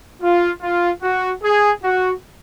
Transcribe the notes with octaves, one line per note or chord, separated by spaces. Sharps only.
F4
F4
F#4
G#4
F#4